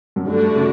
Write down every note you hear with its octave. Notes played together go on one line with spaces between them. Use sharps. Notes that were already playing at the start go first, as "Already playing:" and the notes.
F#2
G2 D3 A3 D4 F#4
C#3